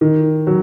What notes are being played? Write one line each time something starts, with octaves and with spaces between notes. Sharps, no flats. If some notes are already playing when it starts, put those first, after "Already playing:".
D#3
F#3